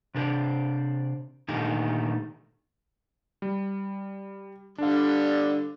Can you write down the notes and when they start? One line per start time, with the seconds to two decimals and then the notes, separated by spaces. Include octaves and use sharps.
0.15 C3 D4 A4 C5 D5
1.49 A#2 D3 D#3 A3 D#4 G4
3.42 G3
4.78 D3 G3 D4 F5